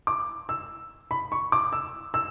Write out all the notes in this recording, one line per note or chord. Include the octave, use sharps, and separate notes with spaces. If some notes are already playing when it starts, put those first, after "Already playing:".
D6
E6
B5
C#6
D6
E6
E6